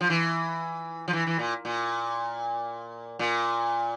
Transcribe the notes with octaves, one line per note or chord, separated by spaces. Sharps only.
F3
E3
F3
E3
E3
A#2
A#2
A#2